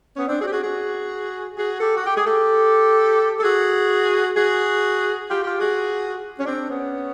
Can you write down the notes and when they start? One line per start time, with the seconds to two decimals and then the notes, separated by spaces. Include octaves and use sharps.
0.16 B3 C#4
0.28 C4 D4
0.40 F#4 G#4
0.46 G4
0.52 F#4 G#4
0.63 F#4 G#4
1.56 F#4 G#4
1.79 G4 A4
1.96 F#4
2.06 G4
2.16 G#4
2.26 G4 A4
3.38 A4
3.42 F#4 G#4
4.35 F#4 G#4
5.29 F4 G4
5.44 F4 G4
5.59 F#4 G#4
6.39 C#4
6.45 C4 D4
6.69 B3 C#4